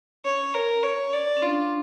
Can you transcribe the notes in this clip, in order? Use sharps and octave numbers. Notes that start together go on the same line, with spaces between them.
C#4 C#5
A#4
C#5
D5
C#4
D4 F4